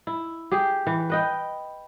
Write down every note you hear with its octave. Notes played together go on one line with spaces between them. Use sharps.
E4
G4 G#4
E3
B4 D#5 G5